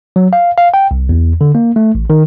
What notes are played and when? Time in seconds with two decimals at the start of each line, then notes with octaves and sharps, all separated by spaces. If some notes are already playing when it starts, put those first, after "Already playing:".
0.16 F#3
0.33 F5
0.58 F5
0.74 G5
0.91 C2
1.09 E2
1.41 D3
1.55 A#3
1.76 A3
1.95 A1
2.10 D#3